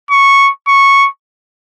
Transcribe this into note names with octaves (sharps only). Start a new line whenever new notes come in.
C#6
C#6